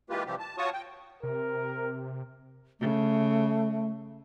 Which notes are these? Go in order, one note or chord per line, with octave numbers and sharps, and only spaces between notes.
E3 G#3 A#3 F4 G4 B4
C3 E3 F3 G3 C4 G4
A5
F4 F#4 C#5 A5 C#6 D#6
G5
C3 A#4
C#3 A3